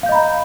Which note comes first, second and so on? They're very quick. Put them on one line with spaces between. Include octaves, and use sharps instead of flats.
F5 G6 D#5 B5 A#5